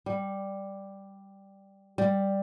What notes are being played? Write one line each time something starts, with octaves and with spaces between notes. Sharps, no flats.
G3
G3